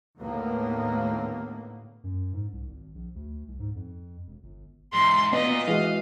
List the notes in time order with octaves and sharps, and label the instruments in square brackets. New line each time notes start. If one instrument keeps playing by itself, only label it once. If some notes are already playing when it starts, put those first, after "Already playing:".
[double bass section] D#2 A2 D3 A#3 B3
[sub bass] F#2
G#2
C2
G#1
A#1
D2
C2
G#2
F2
E1
G1
[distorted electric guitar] E2 G#2 [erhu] C6
[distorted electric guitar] A#2 [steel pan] B3 [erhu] D#5
[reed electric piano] E3 G#3 F#4 [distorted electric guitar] F5